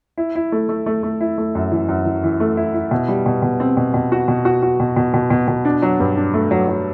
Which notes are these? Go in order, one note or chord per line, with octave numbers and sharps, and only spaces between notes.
E4
E4
A3
A3
A3
A3
E4
A3
F#2
E3
F#2
E3
E3
A3
E4
E4
B2
G3
B2
B2
C4
B2
B2
F#4
B2
F#4
F#4
B2
B2
B2
B2
B2
D4
F#3
G2
D4
A3
F#3
F#3